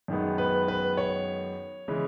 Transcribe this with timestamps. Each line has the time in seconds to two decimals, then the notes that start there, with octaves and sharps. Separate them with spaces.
0.08 F#2 D#3 G#3 B3
0.38 B4
0.68 B4
0.97 C#5
1.88 C#3 E3 G#3